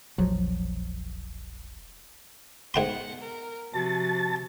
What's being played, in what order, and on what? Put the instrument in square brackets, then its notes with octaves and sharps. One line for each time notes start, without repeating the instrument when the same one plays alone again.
[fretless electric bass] E1 A#1 F3 F#3
[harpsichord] G#2 G5 C6 [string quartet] B2 F#5
[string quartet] A#4
[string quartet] C3 [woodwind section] F3 F#4 [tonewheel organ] A5